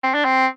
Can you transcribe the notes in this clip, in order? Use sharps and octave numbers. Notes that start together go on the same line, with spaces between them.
C4
D4
C4